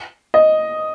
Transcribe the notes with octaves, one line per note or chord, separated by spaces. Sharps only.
D#5